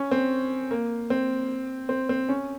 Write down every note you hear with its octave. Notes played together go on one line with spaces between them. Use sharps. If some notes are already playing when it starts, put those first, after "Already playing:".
Already playing: C#4
C4
A#3
C4
C4
C4
C#4